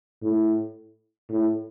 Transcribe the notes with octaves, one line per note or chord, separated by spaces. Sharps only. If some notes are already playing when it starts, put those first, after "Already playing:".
A2
A2